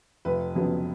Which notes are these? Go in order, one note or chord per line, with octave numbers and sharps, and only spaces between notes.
F1 B4
F2 C#3 F#3 B3